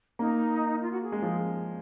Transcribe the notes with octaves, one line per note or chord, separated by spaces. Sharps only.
A#3 D#4
F4
F#4
G#4
G#3
F3